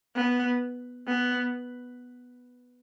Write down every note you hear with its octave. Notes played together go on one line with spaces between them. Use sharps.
B3
B3